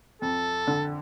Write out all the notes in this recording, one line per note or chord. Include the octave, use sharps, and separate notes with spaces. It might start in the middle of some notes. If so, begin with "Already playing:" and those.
F2 A4
D3